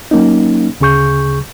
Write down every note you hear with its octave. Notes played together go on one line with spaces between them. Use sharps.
F#3 A#3 C#4 D#4
D2 C#3 G#4 C#6 G6